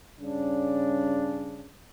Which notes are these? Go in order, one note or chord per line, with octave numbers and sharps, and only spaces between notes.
G2 C#3 C#4 D4